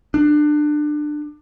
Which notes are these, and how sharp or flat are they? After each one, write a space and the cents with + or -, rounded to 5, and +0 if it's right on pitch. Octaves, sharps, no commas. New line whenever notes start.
D4 +25